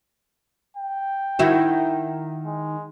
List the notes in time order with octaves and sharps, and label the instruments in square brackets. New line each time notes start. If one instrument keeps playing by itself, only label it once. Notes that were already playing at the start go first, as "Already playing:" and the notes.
[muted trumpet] G5
[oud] D#3 E4 F#4
[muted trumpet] G#3